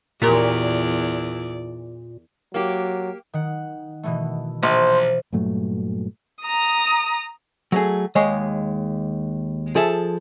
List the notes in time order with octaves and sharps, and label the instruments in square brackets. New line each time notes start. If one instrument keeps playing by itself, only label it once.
[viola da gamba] E2 D5 [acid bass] A#2 [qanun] G4 A#4 C#5
[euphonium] F#3 [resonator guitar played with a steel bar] A#3 G4
[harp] D#3 F#5
B2 E3 A3
[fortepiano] A#1 [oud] F3 [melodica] C5
[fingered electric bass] G2 A#2 F#3 A3
[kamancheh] A#5 D#6
[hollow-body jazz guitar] F#3 A3 G#4
D#2 G#3 C#5 D#5
F3 G#4 A4 E5